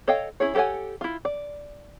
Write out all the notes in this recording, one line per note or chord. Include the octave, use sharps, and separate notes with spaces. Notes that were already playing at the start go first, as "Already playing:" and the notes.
A4 C#5 D#5 F5 G5
C#4 E4 G#4 C#5
G4 A4 C#5 F#5 G#5
E4 F4
D5